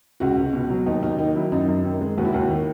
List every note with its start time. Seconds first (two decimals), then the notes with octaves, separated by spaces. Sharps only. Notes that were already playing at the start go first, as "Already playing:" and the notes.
0.20 C#2 F#4
0.37 C#2
0.53 B2
0.70 F#3
0.86 D#2 D#4
1.02 D#2 D#4
1.19 D#3 D#4
1.35 F#3 E4
1.52 F#2 D#4
1.68 F#2
1.85 D#3
2.01 G#3
2.18 D#2 F#4
2.25 E4
2.33 D#2 F#4
2.50 D#3